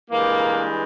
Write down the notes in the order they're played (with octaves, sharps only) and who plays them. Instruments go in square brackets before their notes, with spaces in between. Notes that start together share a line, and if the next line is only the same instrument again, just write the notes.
[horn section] G2 E3 G#3 A#3